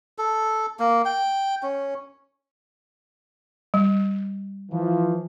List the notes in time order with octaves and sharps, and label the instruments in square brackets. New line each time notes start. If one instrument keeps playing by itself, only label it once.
[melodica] A4
A#3
G5
C#4
[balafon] G3
[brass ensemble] E3 F3